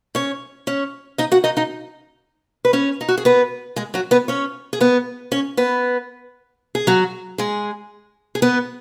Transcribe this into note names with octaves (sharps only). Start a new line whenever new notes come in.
C#4 C#5
C#4 C#5
D#4 D#5
F#4 F#5
D#4 D#5
D#4 D#5
B4
C#4 C#5
D#4
F#4
G#4
B3 B4
G#3 G#4
F#3 F#4
B3 B4
C#4 C#5
G#4
B3 B4
C#4 C#5
B3 B4
G#4
F#3 F#4
G#3 G#4
G#4
B3 B4